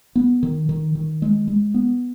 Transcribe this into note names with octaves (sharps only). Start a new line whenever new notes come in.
B3
D#3
D#3
D#3
G#3
G#3
B3